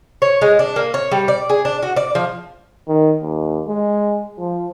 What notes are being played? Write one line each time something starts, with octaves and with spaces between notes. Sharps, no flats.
C#5
G#3
D4
A#3
C#5
G3
D5
G#4
D4
F#4
D5
F3
D#3
D#2
G#3
F3